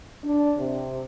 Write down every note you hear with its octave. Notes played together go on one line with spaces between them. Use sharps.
D4
C3